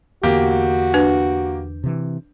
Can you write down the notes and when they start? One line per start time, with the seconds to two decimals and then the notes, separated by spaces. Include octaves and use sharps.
0.23 E2 D3 A#3 B3 F#4 G4
0.94 D4 B4
1.84 C3 E3